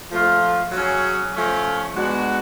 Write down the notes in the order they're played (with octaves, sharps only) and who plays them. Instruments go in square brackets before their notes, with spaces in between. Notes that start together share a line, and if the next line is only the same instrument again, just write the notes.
[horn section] F3 A3 F4
F#3 C#4 G#4
F3 A3 C#4
G#3 B3 D4 F#4